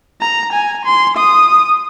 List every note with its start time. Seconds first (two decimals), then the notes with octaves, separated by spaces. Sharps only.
0.22 A#5
0.53 G#5
0.86 C6
1.17 D#6